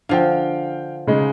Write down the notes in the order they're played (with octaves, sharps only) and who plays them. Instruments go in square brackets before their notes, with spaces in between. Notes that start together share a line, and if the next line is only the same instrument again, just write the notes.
[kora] D3 F3 [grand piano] F5 G5
[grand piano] C#3 G#3 D#4